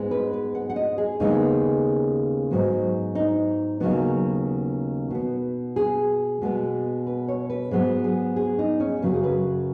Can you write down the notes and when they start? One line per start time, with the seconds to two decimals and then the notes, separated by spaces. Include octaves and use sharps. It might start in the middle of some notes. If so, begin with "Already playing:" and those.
Already playing: G#2 G#3 B3
0.11 B4
0.33 B4
0.55 F#5
0.69 F#5
0.76 D#5
0.98 G#4
1.20 D#2 C#3 G#3 B3 D#4
2.51 G#2 F#3 B3
3.15 D#4
3.80 D#2 C#3 F#3 B3 D#4
5.10 B2 B3
5.76 G#4
6.42 B2 G#3 B3
7.07 B4
7.28 C#5
7.50 B4
7.71 G#2 F#3 B3 G#4
8.04 G#4
8.36 G#4
8.59 D#4
8.80 C#4
9.02 F#2 C#3 F#3 B4
9.13 G#4
9.24 B4